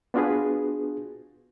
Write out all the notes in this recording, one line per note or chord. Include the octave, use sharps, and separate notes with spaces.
B3 D4 F4 F#4 G#4 B4